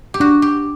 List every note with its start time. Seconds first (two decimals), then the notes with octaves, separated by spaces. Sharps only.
0.14 G4
0.20 D4 F#4
0.42 G4